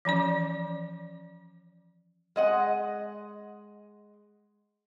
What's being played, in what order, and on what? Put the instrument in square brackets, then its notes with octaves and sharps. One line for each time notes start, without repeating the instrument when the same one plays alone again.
[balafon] E3 F3 C#4 D5
[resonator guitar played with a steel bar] G#3 D#5 F#5